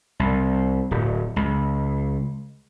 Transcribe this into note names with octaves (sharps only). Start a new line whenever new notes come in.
C2
D1
C#2